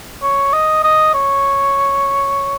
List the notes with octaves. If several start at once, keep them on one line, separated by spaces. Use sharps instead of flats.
C#5
D#5
D#5
C#5